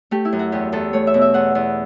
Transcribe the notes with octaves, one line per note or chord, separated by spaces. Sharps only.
A3 G4
E4
F#2
F#4
E2 G4
E2 A4
A3 C#5
E5
B2
E5
E2 F#5
E2